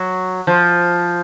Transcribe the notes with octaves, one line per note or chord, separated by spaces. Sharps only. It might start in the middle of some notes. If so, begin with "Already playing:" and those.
Already playing: F#3
F3